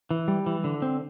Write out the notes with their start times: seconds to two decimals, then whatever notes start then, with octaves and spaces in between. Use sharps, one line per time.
0.11 E3
0.28 G3
0.46 E3
0.64 D3
0.82 C4